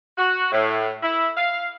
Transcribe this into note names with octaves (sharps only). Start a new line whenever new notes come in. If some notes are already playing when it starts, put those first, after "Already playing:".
F#4
A2
E4
F5